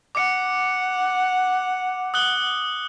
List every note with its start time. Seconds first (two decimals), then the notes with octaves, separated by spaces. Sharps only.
0.15 F#5 D6 C#7
2.14 D#6 F#6 G7